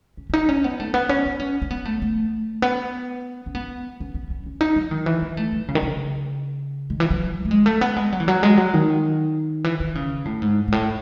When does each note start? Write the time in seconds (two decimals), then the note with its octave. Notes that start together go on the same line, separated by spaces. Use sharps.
0.17 C#4
0.30 C#4
0.34 D#4
0.49 C#4
0.64 B3
0.80 A3
0.94 B3
1.09 C#4
1.26 D#4
1.40 C#4
1.62 C#4
1.71 B3
1.85 A3
2.02 A3
2.62 B3
3.46 C#4
3.55 B3
4.00 C#4
4.14 C#4
4.30 C#4
4.46 C#4
4.61 D#4
4.76 F#3
4.91 D#3
5.06 E3
5.22 B3
5.37 A3
5.52 F#3
5.68 C#3
5.75 D#3
5.83 C#3
6.90 D#3
7.00 E3
7.11 F#3
7.45 A3
7.51 G#3
7.66 A3
7.81 B3
7.96 G#3
8.12 F#3
8.20 E3
8.28 F#3
8.43 G#3
8.57 F#3
8.74 D#3
9.64 E3
9.80 D#3
9.95 C#3
10.25 A2
10.42 G#2
10.68 G#2
10.72 A2